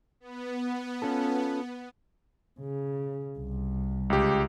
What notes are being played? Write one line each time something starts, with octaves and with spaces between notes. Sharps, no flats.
B3
C#4 F4 A4
C#3
C2
C#2 G4